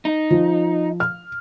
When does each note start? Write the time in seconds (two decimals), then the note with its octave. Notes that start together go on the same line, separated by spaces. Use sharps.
0.05 D#4
0.30 F3
1.00 F6